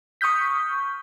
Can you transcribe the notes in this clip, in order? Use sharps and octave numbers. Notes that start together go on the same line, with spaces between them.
C#6 D#6 F6 G6 B6